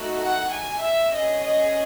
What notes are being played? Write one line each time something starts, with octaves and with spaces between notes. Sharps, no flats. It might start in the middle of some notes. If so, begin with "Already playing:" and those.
Already playing: A3 D#4 F#4 A4
F#5
G#5
E5
C#4 G#4 D#5
D#5